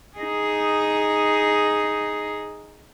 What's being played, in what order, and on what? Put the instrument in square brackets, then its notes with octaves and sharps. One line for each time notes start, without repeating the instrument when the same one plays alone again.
[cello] D#4 G#4